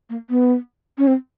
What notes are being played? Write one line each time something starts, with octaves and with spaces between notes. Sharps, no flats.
A#3
B3
C#4
C4